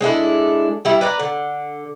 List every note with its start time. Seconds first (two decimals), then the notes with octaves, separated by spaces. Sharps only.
0.01 G#3 D4 E4 A4
0.85 G3 E4
1.01 B4 D5 A#5
1.20 D3